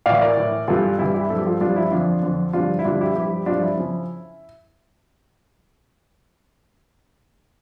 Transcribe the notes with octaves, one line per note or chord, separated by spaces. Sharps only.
A2 E3 D5 F5
A#4 D5
A2 E3
G2 E3 F4 A4
G2 E3 E4
E4 G4
G2 F3 A4
G4
F4 A4
G2 F3 D4 F4
E4
F2 D3 F3 D4 F4
F2 D3 F3
G2 D3 F3 D4 F4
E4
G2 D3 F3 D4 F4
E4 G4
G2 F3 E4 G4
G2 F3 D4 F4
E4
C#3 F3